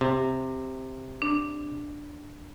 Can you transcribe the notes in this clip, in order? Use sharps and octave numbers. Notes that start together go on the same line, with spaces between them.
C3
D4